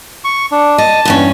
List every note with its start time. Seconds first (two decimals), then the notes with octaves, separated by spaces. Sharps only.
0.24 C#6
0.52 D4
0.78 D#5 A5
1.05 E2 G2 C#4